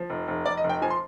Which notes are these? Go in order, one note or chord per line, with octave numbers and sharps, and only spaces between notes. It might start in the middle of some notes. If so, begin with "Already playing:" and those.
Already playing: F3
F1
F1
F1 D5
D#5
F1
G5
F3 G#5
C6